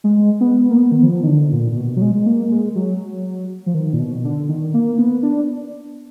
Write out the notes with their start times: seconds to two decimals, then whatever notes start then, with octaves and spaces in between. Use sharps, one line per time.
0.04 G#3
0.41 B3
0.70 A#3
0.78 B3
0.92 D#3
1.03 F3
1.23 D#3
1.27 D3
1.52 A#2
1.72 A#2
1.77 B2
1.97 F#3
2.02 G#3
2.15 G#3
2.26 A#3
2.51 G#3
2.75 F#3
3.66 F3
3.74 D#3
3.93 A#2
3.99 B2
4.24 D3
4.49 D#3
4.74 A#3
4.98 B3
5.23 D4